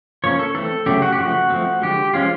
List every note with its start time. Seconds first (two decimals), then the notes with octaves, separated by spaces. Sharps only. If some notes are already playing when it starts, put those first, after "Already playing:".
0.24 F3 A#3 C#4 C#5
0.39 A4
0.54 E3 A3 C4 A4
0.86 C#3 F#3 A3 G4
1.02 F#4
1.12 G4
1.19 C#3 F3 A3 F#4
1.50 F3 A3 C4
1.82 D3 F3 G#3 G4
2.14 F3 G#3 C#4 F4